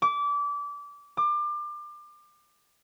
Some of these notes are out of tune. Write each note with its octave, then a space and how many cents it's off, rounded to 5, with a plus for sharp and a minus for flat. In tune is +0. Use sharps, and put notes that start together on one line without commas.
D6 -25
D6 +30